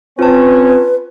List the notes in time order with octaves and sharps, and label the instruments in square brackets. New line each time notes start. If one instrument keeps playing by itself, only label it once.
[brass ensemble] C4 C#4 [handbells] F4 A5 [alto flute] B4